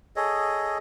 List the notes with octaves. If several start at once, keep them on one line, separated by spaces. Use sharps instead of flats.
G#4 A4 C#5 D#5